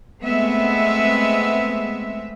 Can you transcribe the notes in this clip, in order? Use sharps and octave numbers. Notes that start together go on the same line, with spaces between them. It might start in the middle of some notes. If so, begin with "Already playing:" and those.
G#3 A3 B3 C4 E5